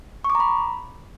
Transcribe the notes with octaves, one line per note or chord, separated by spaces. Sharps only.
C#6
D6
A#5
B5